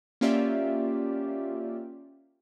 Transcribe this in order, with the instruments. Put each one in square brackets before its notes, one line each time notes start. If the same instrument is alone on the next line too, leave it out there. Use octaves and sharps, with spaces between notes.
[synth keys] A#3 C#4 F4 G4 D5 E5